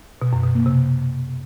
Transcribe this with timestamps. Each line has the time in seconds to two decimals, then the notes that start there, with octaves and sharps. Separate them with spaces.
0.22 B2
0.33 F#2
0.44 B2
0.55 A#3
0.66 C3